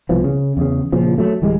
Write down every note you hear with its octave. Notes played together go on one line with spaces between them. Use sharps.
C2 B2 E3 F3
C#3
E2 C#3
A#2 C#3 F3
F#3 A3
D1 E3 G3 G#3